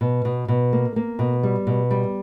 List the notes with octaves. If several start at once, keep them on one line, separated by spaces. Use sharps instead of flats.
B2
B2
B2
A#3
A#3
B2
G3
B2
G3